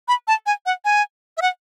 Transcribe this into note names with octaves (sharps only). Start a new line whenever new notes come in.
B5
A5
G#5
F#5
G#5
E5
F#5